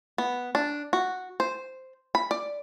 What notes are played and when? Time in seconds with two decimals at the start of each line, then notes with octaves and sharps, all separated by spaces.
0.18 B3
0.55 D4
0.93 F#4
1.40 C5
2.15 B5
2.31 D5